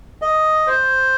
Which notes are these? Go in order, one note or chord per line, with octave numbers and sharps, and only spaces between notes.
D#5
C5